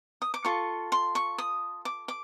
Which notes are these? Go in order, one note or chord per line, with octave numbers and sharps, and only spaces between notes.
D#6
D6
F4 A4 C#6
C6
C#6
D#6
D6
D6